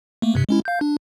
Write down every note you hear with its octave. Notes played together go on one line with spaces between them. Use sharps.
A3 A#3
G2 C3
G#3 C#4 E4
F5 G6
D4